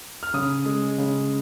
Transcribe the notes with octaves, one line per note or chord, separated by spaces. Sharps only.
F6
C#3 D#6
G#3
C#3